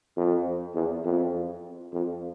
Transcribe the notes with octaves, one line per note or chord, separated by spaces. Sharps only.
F2
E2
F2
F2